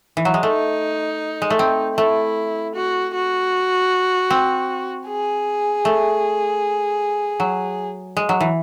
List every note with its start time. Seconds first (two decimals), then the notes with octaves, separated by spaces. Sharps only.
0.17 E3
0.25 F#3
0.34 G#3
0.43 A3 D#4
1.42 G#3
1.50 A3
1.59 C4
1.97 A3 E4
2.75 F#4
3.15 F#4
4.30 C4
5.07 G#4
5.85 A3
7.40 F#3
8.17 G#3
8.29 F#3
8.40 E3